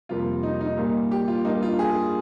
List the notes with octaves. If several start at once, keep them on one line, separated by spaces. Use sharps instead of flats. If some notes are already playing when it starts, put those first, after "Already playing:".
F2 C3 G3 A#3 F4
D#4
D#4
A#2 G3 A#3
G4
F4
G2 G3 A#3 D#4
F4
G#4